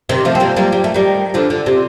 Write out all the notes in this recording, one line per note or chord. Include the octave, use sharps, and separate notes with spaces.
C3 D#3
F3 A3
C4
G3 A#3
G3 A#3
G3
A3
D#3 G3
D3 F3
D3
C3